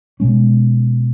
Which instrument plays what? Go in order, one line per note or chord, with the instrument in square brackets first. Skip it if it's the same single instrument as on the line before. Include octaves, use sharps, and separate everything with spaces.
[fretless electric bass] B2 G#3 C#4